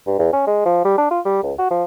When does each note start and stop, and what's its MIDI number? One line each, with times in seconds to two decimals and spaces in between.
0.07 0.16 43
0.19 0.30 40
0.33 0.44 61
0.47 0.62 56
0.65 0.84 53
0.85 0.97 55
0.98 1.08 62
1.10 1.20 65
1.25 1.43 55
1.43 1.52 37
1.58 1.70 66
1.71 1.84 53